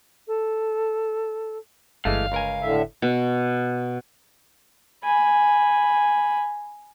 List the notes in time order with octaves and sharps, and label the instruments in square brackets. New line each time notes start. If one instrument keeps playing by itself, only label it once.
[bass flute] A4
[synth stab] G1 [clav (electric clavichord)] E3 G#3 A3 [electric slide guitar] F5
[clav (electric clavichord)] C#2 A#4 G#5
[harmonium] A2 D3 E5
[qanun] B2
[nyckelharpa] G#5 B5